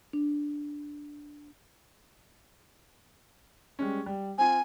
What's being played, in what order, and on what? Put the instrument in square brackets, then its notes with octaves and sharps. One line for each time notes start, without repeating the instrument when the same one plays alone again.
[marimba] D4
[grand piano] G3 G#3 C#4
G3
[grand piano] C4 F4 [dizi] G#5